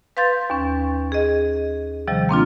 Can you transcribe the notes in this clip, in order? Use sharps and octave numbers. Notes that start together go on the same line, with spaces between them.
B4 F5 C6 G6 A6
D#2 C#4
G#4 D#5
C3 D#3 F3 G3
A#3 C4 D4 F4